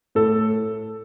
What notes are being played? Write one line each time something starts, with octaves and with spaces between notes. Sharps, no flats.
A2 A4